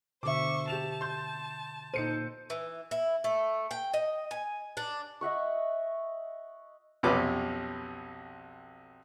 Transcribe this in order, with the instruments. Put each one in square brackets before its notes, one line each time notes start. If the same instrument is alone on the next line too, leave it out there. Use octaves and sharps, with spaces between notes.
[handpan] B2 D3 E5 [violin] C5 C#6 [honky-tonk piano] D6
[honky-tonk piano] G4 E7 F7 [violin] A5
[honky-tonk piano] C6 G6
[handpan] A#2 A4 C5 [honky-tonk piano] D#4 C#7 D#7
[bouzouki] E3
E4
A3
G5
D#5
G#5
D4
[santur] D#5 E5 F#5 C#6
[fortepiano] B1 F2 C3 C#4 B4 D6